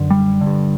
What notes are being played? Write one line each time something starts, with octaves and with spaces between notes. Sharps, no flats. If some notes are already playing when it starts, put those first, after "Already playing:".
Already playing: F#2 D3
G3
D3
G2